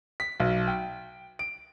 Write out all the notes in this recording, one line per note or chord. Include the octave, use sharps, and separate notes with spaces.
B6
B1
G5
D7